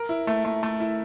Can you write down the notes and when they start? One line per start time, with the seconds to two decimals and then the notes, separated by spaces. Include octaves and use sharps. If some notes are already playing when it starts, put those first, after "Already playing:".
Already playing: A#4
0.09 E4
0.27 A3
0.45 A3
0.63 A3
0.80 E4